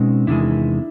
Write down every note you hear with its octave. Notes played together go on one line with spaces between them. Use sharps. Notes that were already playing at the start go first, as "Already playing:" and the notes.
Already playing: B2 G#3 C4 C#4 D#4
E2 C3 D#3 G#3 D4 E4